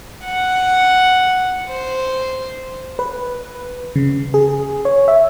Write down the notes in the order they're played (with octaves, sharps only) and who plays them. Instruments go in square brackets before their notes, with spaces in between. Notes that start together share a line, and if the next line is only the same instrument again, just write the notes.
[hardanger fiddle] F#5
C5
[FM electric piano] B4
C#3
G#4
C#5
E5